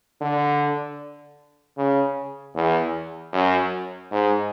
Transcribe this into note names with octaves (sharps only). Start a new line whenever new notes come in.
D3
C#3
E2
F#2
G#2